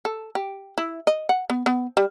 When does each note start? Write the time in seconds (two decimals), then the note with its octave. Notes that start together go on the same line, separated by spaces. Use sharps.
0.05 A4
0.35 G4
0.78 E4
1.07 D#5
1.29 F#5
1.50 B3
1.66 B3
1.97 G3